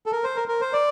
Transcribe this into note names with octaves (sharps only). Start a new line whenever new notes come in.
A4
A#4
C5
A#4
A#4
C5
D5